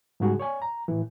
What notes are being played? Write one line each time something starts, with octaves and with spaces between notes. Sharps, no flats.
G#2 C#3 G3 F#4 G#4
C#5 D5 G#5
A#5
A2 E3